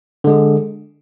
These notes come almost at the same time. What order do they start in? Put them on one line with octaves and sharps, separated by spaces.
D3 G#3 G#4